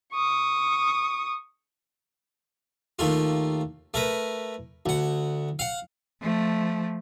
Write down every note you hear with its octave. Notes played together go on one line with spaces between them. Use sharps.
C#6 D#6
D#2 A3 F4
A3 A#4 B4
D2 F#5
F5 F#5
F3 A3